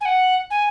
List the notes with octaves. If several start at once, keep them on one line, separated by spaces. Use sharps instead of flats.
G#5
F#5
G#5